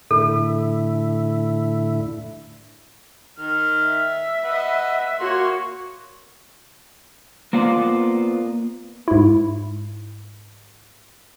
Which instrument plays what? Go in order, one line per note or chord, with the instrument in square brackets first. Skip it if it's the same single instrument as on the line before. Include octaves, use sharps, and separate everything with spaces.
[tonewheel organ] A2 D3 E4 [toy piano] A4
[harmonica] D#3 F6
[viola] E5
[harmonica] B4 D#5 F#5
[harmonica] A#3 C6 [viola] F#4 C#5
[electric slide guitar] A#3 B3 F4 C5 D5
[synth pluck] G#2 E4